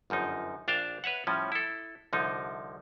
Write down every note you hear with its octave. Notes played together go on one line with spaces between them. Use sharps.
G1 F#2 F3 D#4
A#1 D4 F5 G5 A5
B4 C#5 E5 F#5
A2 F3 G3 C#4
E4 A4
C2 D3 F3 D#4